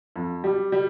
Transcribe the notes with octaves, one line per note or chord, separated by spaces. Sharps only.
F2
G3
G3